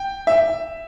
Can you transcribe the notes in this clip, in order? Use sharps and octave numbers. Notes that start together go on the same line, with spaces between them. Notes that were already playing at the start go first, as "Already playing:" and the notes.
Already playing: G5
E5